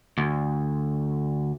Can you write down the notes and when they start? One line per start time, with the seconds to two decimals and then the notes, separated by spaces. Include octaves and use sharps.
0.18 D2